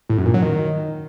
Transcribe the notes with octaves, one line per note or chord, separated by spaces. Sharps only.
A2
F#2
A#2
F#3
D#3